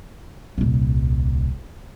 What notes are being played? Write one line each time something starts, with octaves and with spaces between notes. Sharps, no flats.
D#1 C2